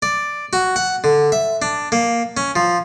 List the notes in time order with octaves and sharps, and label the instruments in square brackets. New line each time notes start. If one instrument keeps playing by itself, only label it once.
[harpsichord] D5
F#4
F#5
D3
E5
D4
A#3
C#4
F3